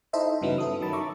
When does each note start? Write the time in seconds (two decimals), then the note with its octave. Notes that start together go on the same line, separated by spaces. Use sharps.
0.13 D#4 E4 A4 C5 D#5 E5
0.42 G2 C#3 E3 F#3 B3
0.58 E4 A4 D#6
0.81 D#3 F#3 A5 B5
0.93 E5 A#5 C#6 D6